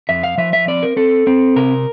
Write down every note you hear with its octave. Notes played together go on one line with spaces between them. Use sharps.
F2 E5
F5
F3 E5
E5
C4 D5
A#4
C4 A4
C4
C3 A#4